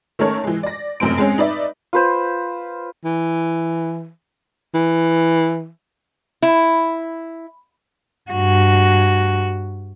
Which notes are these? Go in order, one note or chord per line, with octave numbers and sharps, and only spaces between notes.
D#3 A3 C#4 A4 A#4 C#5
E3 G#3
D5 A#6
F1 F#2 A2 C4 D7
G#3 C4 C#4
D#4 B4 D5 E5
F4 B4 C5
E3
E3
E4
G2 F#4